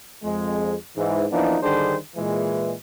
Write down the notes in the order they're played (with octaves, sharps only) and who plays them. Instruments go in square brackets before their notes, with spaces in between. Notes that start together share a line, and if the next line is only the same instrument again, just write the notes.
[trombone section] F2 G#3
G#2 E3
E3 F3 A#3 B3 D4 D#4
D3 D#3 G3 D4 G#4 C5
A#2 E3 G#3